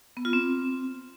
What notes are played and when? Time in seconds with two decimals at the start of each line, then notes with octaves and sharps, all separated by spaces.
0.17 B3
0.25 F4
0.33 C4